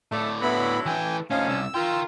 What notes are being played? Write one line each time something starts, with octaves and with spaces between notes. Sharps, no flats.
A2 A3 D5
D3 F#3 B3 E4 B5
E3 A4 G5 G#5
D3 F3 A3 C#4 D#4 F5
C2 E6
F4 A#4 G5